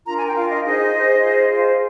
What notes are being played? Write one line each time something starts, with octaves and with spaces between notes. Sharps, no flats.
D4 F4 A#4 A#5
G#5
G5
D4 F4 A#4 F5
D#5
D#4 G#4 C5 D#5
D#4 G#4 C5
F4 G#4 C5
F4 G#4 C5